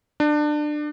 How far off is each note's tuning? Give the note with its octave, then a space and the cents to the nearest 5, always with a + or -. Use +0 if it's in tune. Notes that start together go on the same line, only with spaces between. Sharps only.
D4 +25